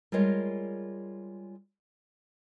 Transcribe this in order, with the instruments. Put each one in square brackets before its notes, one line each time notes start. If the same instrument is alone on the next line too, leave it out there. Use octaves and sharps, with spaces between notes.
[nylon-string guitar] G3 G#3 F4 G#4 A#4 C#5